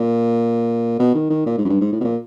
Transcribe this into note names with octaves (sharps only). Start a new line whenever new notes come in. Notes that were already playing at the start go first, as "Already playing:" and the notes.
Already playing: A#2
B2
D#3
D#3
A#2
G#2
F#2
G2
G#2
A2
B2
A#2